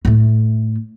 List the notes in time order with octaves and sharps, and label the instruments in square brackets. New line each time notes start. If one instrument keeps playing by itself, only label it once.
[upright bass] A2 A3